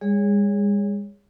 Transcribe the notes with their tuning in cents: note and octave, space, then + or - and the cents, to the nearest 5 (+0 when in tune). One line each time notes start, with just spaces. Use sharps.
G#3 -45 G#4 -15 C#5 +15